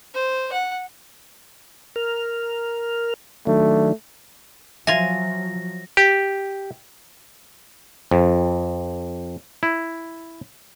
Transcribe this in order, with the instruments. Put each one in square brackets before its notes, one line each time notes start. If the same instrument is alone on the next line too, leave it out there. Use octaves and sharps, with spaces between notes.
[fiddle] C5
F#5
[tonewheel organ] A#4 F6
[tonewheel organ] D#3 F#3 D4 [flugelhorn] A3
[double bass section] F3 F#3 [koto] F4 G#5 [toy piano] E5 [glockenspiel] A#6
[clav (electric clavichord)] G4
F2
E4